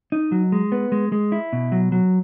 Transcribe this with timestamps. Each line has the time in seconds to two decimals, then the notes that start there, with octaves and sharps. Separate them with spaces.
0.12 D#4
0.32 F#3
0.52 G#3
0.72 B3
0.92 G#3
1.12 G#3
1.32 E4
1.53 B2
1.72 F#3
1.92 F#3